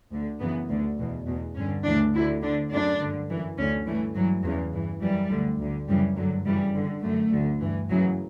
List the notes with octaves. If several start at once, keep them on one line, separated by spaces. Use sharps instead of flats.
D2 D3
F#2 C#3 E3 B3
D2 D3
E2 B2
E2 B2
G2 D3 C#4
D2 C#3 E3 D4
D2 D3 E4
D2 D3 D4
F#2 D3 D4
G2 D3
F#2 E3
D2 D3 C#4
G2 E3 A3
G2 E3 F#3
E2 C#3 E3 F#3
G2 E3
F#2 E3 G3
D2 D3
D2 D3
F#2 C#3 E3 G3
G2 D3 F#3
F#2 C#3 E3 G3
G2 D3
F#2 D3 A3
D2 D3
G2 E3
F#2 C#3 E3 F#3